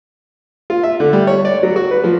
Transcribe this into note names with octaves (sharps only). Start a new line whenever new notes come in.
F4
E5
D3
G3
C#5
D5
F#3
F#4
B4
F3